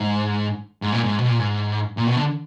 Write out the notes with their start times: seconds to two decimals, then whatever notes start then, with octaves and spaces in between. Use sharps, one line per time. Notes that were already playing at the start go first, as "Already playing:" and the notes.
Already playing: G#2
0.82 G#2
0.92 A#2
1.03 G#2
1.18 B2
1.29 A#2
1.39 G#2
1.97 A#2
2.07 B2
2.16 D3